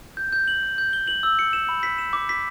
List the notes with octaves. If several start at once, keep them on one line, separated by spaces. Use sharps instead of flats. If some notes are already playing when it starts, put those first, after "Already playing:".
G6
G6
F#7
G6
G6
G7
F#7
E6
C#7
E7
B5
B6
E7
D6
B6